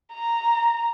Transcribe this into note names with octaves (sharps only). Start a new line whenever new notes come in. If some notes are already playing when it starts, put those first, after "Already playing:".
A#5